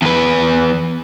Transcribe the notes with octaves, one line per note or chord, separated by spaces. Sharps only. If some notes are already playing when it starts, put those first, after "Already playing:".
E2 B4